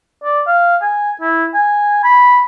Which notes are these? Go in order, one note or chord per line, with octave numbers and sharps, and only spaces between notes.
D5
F5
G#5
E4
G#5
B5